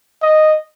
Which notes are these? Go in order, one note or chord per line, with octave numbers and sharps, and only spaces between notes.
D#5